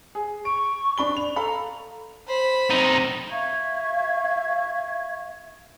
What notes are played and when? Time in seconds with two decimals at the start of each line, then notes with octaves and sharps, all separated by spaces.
0.15 G#4
0.45 C#6 D7
0.98 D4 B5 G7
1.17 F7
1.36 A4 F5 A#5 B5
2.27 C5 B5
2.70 C3 D#4
3.31 E5 F5 C#6 G#6